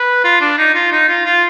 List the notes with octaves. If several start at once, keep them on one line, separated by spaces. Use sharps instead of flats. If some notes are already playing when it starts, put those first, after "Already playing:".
Already playing: B4
F4
D4
D#4
F4
D#4
F4
F4